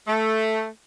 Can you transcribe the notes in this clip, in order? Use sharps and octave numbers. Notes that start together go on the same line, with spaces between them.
A3